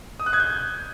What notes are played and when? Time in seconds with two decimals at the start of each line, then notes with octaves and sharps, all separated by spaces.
0.20 D#6
0.26 F#6
0.33 G#6
0.40 G6